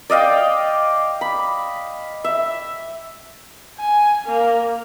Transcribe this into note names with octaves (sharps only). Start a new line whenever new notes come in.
D5 D#5 F5 G5
B5
E5
G#5
A#3